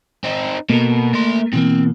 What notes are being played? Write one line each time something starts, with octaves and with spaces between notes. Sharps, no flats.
C4 D#4
B2 A#3 A4 A#4
A3 C6
B2 E3 A#3 C4